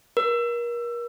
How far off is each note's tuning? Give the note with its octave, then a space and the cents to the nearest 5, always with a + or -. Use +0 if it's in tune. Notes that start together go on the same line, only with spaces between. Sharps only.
A#4 +35